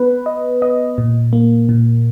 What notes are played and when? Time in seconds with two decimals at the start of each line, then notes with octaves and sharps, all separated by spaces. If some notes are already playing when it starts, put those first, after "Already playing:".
Already playing: B3 B4
0.26 D#5
0.62 D#5
0.98 A#2
1.33 A#3
1.69 A#2